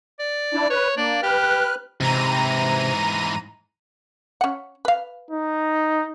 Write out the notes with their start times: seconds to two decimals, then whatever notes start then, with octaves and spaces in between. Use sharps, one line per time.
0.19 D5
0.54 D4 E4
0.70 B4 C#5
0.97 A#3 D4
1.23 G4 B4 F6 F#6
2.00 G#2 C3 E3 A#5 D#7
4.41 C#4 F#5
4.85 B4 F5
5.31 D#4